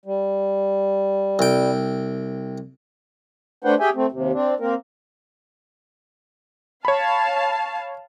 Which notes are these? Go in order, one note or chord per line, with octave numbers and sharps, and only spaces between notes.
G3
C2 G5
A3 D4 B4 C5 F#5 G5
G4 G#4 E5 G5 G#5
A3 C4
D#2 C3
C4 D4
A#3 C4 A#4
C#5 F5 A5 B5